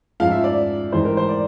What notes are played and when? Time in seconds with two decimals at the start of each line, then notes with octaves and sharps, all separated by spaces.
0.20 G#2 F3 G#3 C#4 F5
0.31 E5
0.44 D5
0.92 A1 G#2 E3 G#3 C5
1.05 A#4
1.17 C5
1.29 D5